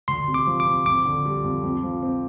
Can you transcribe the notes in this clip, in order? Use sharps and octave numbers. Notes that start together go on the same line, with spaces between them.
D2 C6
C3
D6
F3
D6
C4
F2 D6
D3
G3
F2
F2
F3
C4